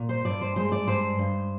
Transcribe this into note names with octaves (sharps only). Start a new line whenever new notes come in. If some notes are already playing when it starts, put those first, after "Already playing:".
Already playing: A#2
C5
G2 D5
C5
G#3 C5
D5
G2 C5
G2